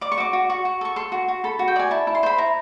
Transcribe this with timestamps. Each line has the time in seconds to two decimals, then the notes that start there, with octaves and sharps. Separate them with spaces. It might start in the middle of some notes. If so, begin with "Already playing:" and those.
0.01 D5 D6
0.12 C#6
0.18 F#4 D6
0.33 F#4
0.50 F#4 C#6
0.65 F#4
0.81 A4 C#6
0.96 A4 C6
1.12 F#4
1.28 F#4
1.44 A4 B5
1.59 F#4
1.68 G5
1.76 D5 G#5
1.91 E4 A5
2.07 E4
2.15 C6
2.23 C5 B5
2.38 E4 A#5